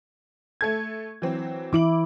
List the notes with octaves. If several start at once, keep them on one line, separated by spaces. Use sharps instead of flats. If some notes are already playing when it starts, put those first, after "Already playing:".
A3 A4 G#6
E3 F#3 C4
E3 E4 D6 D7 F#7